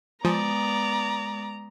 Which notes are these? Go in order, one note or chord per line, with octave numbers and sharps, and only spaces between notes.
F3 G#3 B3 D5 A#5